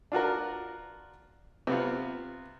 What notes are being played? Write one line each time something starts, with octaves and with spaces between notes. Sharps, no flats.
D4 F4 F#4 A#4
C3 B3 F4